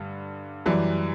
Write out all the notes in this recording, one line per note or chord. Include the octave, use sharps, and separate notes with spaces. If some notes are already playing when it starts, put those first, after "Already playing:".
Already playing: G2 D3 G3
F#2 E3 G3